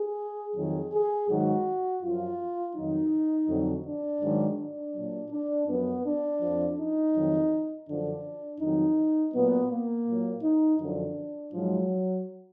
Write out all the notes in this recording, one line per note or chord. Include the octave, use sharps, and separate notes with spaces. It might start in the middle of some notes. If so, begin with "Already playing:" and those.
Already playing: G#4
F2 D#3 F#3 G#4
G#4
G#2 D#3 F#3 F#4
F#2 F3 F4
F2 D#3 F#3 D#4
F2 D3 F#3
D4
G#2 D#3 F#3
D4
A#2 F#3
D4
F#2 F3 B3
D4
F2 F3
D#4
F2 D#3 F#3
F#2 D3 F3 D4
F2 D#3 F#3 D#4
A#2 F#3 B3
A#3
A#2
F#3
D#4
F#2 D3 F3 D4
G#2 F3 F#3